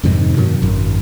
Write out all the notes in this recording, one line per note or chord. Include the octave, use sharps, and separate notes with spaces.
F2 G#2 C3 D#3
G2 B2 D#3 F#3
G#1 F#2